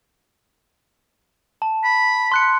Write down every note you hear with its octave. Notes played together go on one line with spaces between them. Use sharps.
A5
B5
C6 F#6 C#7